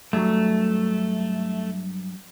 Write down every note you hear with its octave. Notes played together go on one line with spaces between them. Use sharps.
G2 F#3 A3